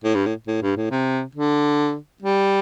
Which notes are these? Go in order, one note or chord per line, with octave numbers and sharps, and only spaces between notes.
A2
G2
A2
A2
G2
A2
C3
D3
G3